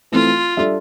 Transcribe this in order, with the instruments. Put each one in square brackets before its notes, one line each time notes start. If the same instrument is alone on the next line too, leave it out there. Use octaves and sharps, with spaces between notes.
[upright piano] E3 A3 C4 [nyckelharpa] F4
[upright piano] G3 D4 A4 E5